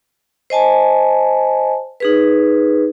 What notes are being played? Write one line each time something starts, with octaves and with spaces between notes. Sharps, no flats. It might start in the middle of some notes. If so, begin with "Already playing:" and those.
C5 D#5 G#5 A5
D#4 G#4 B4